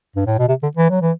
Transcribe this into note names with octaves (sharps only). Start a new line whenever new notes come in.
G2
A2
B2
C3
D3
E3
F#3
E3